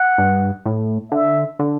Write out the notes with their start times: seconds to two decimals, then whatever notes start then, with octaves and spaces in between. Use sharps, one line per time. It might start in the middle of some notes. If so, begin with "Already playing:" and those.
Already playing: F#5
0.18 G2
0.65 A2
1.12 D3 E5
1.59 D3